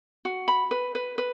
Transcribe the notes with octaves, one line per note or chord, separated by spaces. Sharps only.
F#4
B5
B4
B4
B4